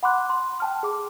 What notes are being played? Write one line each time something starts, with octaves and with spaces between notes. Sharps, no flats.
F#5 B5 C6 D6 F#6
C6
G5 A5 F6
G#4 D6